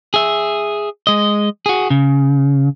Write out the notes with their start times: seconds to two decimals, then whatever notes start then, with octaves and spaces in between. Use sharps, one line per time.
0.14 G#4 E5
1.07 G#3 D#5
1.66 F#4 G#4
1.90 C#3